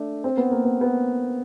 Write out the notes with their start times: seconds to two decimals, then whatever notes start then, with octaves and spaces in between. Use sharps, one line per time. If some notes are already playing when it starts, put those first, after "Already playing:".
Already playing: A3 D4
0.24 C4
0.37 B3
0.51 A#3
0.65 B3
0.81 B3